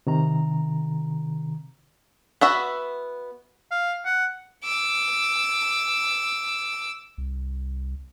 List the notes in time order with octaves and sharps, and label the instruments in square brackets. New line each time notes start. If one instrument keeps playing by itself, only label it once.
[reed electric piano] C3 D#3 A#5
[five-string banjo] B3 F#4 E5
[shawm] F5
F#5
[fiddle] D6 E6
[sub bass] C2